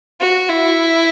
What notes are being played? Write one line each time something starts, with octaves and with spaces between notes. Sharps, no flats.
F#4
E4